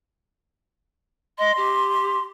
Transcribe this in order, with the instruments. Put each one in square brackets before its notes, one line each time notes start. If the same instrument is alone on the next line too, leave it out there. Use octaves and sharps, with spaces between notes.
[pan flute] D#5 [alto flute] C6
[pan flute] G4